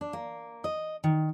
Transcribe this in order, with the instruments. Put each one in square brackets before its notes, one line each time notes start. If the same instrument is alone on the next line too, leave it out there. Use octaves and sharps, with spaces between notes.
[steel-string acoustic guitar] D4
A#3
D#5
D#3